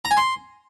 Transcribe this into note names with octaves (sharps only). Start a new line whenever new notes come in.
A#5
G#5
C6